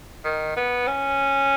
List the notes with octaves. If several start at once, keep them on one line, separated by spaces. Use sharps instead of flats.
D#3
B3
C#4